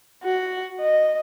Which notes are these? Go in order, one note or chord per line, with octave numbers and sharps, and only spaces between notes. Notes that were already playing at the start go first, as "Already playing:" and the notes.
F#4
D#5